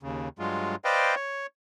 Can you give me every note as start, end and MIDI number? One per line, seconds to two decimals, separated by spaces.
0.03 0.29 39
0.03 0.29 49
0.39 0.76 43
0.39 0.76 54
0.39 0.76 56
0.39 0.76 65
0.85 1.15 71
0.85 1.15 72
0.85 1.15 74
0.85 1.15 75
0.85 1.15 77
0.85 1.15 79
1.15 1.47 73